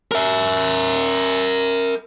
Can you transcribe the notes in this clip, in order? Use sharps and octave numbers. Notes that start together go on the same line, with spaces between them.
A#4 E5